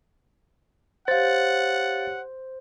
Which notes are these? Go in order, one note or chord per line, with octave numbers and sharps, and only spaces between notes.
G4 C5 C#5 F5 F#5 A6